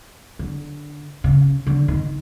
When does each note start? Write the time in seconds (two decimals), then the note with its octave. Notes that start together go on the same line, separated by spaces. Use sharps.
0.39 D3
1.24 C#3
1.67 D3
1.88 D#3